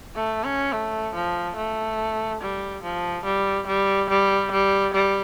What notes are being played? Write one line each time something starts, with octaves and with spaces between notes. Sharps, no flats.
A3
C#4
A3
F3
A3
G3
F3
G3
G3
G3
G3
G3